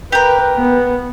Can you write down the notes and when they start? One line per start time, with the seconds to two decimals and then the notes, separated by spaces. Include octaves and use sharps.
0.12 G4 A#4 B4
0.56 B3